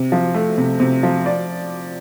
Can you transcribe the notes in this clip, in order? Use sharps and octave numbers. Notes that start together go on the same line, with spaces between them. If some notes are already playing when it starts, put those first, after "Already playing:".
Already playing: C3
F3
A3
C3
C3
F3
D5